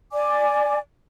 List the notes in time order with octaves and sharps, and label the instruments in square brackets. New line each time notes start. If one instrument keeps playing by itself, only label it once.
[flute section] D5 G#5 D6